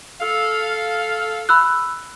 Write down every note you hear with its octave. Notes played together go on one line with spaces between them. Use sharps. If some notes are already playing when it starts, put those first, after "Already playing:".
A4 F5
B5 E6 F#6